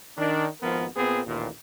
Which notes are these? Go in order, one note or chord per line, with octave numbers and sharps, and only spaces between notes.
D#3 D4
G#1 F3 B3 A#4
A#2 B3 C4 G#4
A1 D#2 A#2